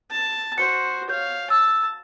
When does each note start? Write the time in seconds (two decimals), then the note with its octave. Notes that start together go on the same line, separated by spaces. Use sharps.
0.11 A5
0.58 F#4 C5 C#7
1.09 C#5 F5 G6
1.50 A5 E6